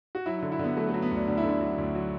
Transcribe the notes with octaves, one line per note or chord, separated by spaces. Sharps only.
F#4
F#3 E4
D3 E4
E4
D3 B3
F#3 A3
A3
F#3
B3
D2 D4
D2 D4
E4
D3
D4
F#3
D2
F#3